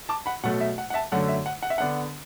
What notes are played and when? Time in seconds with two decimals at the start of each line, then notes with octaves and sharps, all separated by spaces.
0.09 A5 D6
0.26 F#5 B5
0.43 B2 F#3 A3 F#5
0.61 E5
0.78 F#5
0.90 F#5
0.94 E5 A5
1.12 F#2 D3 F#3 A3 F#5
1.28 E5
1.46 F#5
1.63 F#5
1.70 E5
1.78 D3 B3 D4 F#5